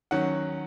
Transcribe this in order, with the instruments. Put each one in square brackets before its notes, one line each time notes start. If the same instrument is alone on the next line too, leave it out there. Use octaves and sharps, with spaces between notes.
[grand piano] D#3 F#3 C#4 F#5